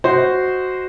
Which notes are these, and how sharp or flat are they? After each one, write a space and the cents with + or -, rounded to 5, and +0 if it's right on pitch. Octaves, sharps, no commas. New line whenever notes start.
F#4 +0 C5 -10 D#5 +5